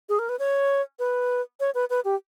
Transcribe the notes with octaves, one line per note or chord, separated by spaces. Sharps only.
G#4
A#4
B4
C#5
B4
C#5
B4
B4
G4